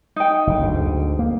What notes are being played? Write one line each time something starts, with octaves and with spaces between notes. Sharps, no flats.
D#4 G5
F#1 D3
D2 G#2
A#3